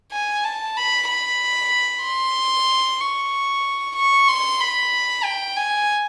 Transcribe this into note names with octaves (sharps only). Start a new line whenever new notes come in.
G#5
A5
B5
B5
C6
C#6
C#6
C6
B5
G5
G#5